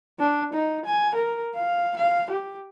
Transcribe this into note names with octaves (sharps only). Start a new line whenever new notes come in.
D4
D#4
G#5
A#4
F5
F5
G4